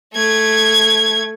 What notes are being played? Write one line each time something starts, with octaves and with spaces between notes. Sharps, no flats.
A3 G#6